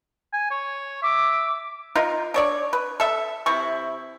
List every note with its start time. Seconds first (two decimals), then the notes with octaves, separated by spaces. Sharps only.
0.33 G#5
0.51 C#5
1.03 E5 D6
1.95 D#4 F4 A#4
2.34 D4 C#5 D5
2.73 B4
3.00 A4 E5
3.46 C3 E4 C#6